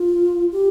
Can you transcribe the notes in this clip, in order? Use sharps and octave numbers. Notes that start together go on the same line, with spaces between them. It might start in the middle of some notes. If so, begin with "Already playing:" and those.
Already playing: F4
G4